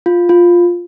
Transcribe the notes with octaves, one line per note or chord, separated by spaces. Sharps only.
F4
F4